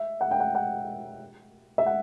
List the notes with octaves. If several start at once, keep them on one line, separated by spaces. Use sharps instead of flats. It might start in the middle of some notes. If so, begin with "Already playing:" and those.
Already playing: E5
F#5
G5
F#5
F#5
E5
F#5